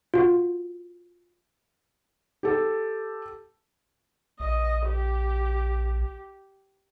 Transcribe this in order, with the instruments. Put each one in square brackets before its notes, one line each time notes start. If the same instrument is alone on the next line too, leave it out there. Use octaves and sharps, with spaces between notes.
[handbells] F4 F#4
[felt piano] G4 A4
[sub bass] A#1 [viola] D#5
[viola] G4